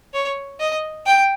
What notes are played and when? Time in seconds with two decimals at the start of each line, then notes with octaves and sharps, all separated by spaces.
0.14 C#5
0.60 D#5
1.06 G5